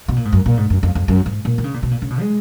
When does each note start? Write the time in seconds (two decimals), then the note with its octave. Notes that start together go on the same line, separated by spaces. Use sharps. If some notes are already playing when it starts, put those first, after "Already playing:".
0.08 B2
0.16 A#2
0.25 G#2
0.32 F#2
0.46 A#2
0.57 G#2
0.70 F#2
0.83 F2
0.95 F2
1.08 F#2
1.26 G#2
1.45 A#2
1.58 D#3
1.64 C#3
1.74 A#2
1.83 B2
1.91 A#2
2.02 C#3
2.10 B2
2.20 G#3